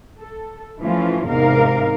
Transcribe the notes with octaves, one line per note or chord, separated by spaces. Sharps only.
A4
E3 F3 A3 C#4 F4
E2 G#2 C3 D#4 A#4 F5